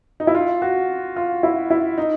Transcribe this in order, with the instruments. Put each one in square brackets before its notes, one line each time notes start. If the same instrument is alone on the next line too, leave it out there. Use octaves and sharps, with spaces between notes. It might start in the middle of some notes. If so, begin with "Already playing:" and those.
[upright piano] D#4
E4
F4
F#4
F4
E4
E4
D#4